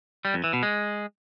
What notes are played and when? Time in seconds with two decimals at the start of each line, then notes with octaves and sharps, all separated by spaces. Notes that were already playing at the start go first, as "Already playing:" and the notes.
0.25 G3
0.34 F2
0.44 E3
0.53 B2
0.63 G#3